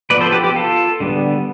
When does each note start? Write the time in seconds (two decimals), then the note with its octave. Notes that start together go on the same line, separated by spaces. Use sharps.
0.10 F3 B3 B4 D5
0.21 A4 C5
0.32 G4 B4
0.44 G4
0.56 F4 A4
1.00 D3 G3 B3